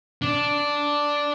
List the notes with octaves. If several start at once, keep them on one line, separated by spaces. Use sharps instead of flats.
D4